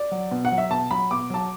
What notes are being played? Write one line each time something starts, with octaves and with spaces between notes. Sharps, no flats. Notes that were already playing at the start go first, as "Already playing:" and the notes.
Already playing: D5
F#3
B2
F#5
F#3
E5
B2 A5
F#3 B5
B2 D6
F#3 A5